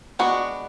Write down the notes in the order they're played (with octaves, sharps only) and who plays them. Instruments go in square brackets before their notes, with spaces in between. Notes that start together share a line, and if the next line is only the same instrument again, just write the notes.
[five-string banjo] G#3 B3 D4 F#4